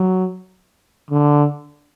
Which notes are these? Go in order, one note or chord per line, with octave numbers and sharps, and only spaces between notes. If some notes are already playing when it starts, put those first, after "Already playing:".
Already playing: F#3
D3